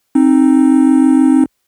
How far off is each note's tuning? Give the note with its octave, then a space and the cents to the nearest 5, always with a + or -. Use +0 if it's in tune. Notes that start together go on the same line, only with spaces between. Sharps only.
C4 +20 D#4 +0